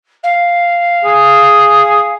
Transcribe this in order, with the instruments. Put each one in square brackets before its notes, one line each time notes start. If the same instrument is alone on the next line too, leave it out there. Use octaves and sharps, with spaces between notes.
[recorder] F5
[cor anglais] G#4